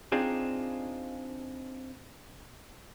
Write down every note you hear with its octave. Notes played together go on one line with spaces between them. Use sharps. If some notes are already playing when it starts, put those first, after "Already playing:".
C4 D4 D#4 F4 G#4